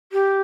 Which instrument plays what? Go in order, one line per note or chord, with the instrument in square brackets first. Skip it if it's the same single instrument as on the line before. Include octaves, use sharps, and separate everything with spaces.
[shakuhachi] G4